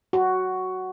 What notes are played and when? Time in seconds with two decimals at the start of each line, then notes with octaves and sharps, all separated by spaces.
0.13 F#4